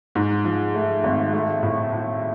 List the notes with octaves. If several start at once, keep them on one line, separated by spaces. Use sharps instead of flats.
G#2
F3
A3
G#1
A3
A2
A2